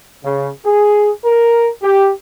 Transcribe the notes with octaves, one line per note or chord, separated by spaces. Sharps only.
C#3
G#4
A#4
G4